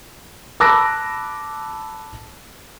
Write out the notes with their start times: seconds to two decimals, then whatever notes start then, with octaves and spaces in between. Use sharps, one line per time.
0.60 A5 B5 D6 E6 F#6 A#6